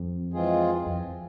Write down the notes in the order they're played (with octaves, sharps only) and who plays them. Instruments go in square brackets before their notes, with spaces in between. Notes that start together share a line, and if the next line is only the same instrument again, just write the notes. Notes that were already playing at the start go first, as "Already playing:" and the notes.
Already playing: [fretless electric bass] F2
[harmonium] E3 G#3 C4 F4 G#4
[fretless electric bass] F2